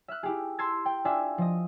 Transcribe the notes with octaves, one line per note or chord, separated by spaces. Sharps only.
E5 F6 F#6
E4 G4 G#4
A5 C6 E6 G#6 A6
G5
D4 F4 E5 G#5
F3 D#5